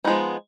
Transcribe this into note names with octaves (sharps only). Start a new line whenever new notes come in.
F3 G#3 B3 D#4